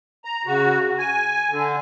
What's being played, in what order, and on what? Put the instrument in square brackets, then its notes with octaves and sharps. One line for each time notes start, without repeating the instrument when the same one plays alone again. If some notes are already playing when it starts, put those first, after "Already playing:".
[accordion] A#5
C#3 F#4
G#5
D3